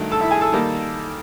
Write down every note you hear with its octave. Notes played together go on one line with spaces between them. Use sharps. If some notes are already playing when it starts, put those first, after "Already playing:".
Already playing: G2 D#3 F#3 A3
A4 A5
E4 E5
G#4 G#5
A4 A5
D#3 G3 A#3